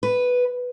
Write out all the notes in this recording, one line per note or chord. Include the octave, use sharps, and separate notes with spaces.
B4